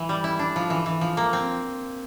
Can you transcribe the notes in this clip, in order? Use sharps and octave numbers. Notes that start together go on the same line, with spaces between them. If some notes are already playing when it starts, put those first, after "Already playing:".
Already playing: E3
G3
E4
D4
F3
E3
E3
F3
A#3
C4